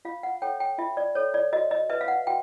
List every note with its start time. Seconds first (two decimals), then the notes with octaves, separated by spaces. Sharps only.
0.05 F4 F5
0.23 F#5
0.42 A4 C#5 G5
0.60 G5
0.78 F4 E5
0.97 D5
1.15 A4 C#5
1.34 D5
1.53 F#4 D#5
1.71 D#5
1.90 B4 E5
2.01 F5
2.08 F#5
2.27 F#4 G5